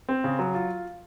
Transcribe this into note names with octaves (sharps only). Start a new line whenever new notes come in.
C4
C#3
F#3
F4